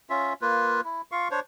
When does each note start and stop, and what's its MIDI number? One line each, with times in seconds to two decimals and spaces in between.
0.10 0.33 61
0.10 0.33 65
0.10 0.33 76
0.42 0.81 58
0.42 0.81 65
0.42 0.81 71
0.85 1.02 64
1.12 1.28 65
1.12 1.28 77
1.12 1.28 85
1.31 1.40 62
1.31 1.40 72
1.31 1.40 73